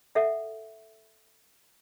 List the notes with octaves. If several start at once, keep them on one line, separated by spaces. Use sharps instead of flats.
A4 E5 F#5